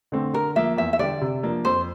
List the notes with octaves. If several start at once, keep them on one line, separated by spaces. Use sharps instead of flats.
D3 A3 C4
D3 A#4
F3 A#3 E5
E2 E5
E5
D3 G3 D4 G4 D5
C3
F3 A#3 D4
F2 C5